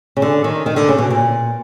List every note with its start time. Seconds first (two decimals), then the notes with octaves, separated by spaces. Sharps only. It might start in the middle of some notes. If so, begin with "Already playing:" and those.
0.17 C#3
0.22 D3
0.44 D#3
0.66 D#3
0.76 D3
0.88 C#3
0.98 B2
1.10 A#2